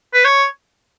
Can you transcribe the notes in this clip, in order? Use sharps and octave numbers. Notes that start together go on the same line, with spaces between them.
B4
C#5